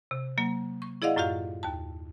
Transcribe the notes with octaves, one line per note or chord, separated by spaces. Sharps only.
C3
F#3 A#3
C#6
E4 G#4 D5 D#5 F5 F#5
F#2 A2 F4 G4 F5
D#2 A5